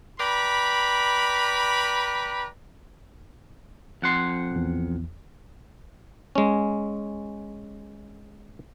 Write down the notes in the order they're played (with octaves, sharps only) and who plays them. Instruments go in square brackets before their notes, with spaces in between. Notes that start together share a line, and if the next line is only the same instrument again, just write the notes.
[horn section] B4 D5 G5 A#5 B5
[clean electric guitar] F2 F#5 C6
[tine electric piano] A#1 E2
[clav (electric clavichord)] G#3 C#4